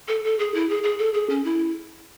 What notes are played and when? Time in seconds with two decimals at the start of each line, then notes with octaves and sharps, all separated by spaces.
0.08 A4
0.24 A4
0.39 G#4
0.54 E4
0.69 G#4
0.83 G#4
0.98 A4
1.14 G#4
1.30 C#4
1.44 E4